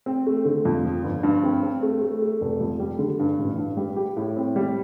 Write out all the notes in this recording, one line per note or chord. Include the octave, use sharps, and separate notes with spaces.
C4
A3
D3
F2
F3
G1
G2
C4
C4
A3
A3
A3
F1
F2
G3
D3
G2
A1
G2
G3
G4
A2
C4
G3